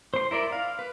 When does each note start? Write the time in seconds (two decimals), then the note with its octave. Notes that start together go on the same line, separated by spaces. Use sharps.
0.14 C5 C6
0.31 E4 A#4 D5
0.52 F5
0.79 B4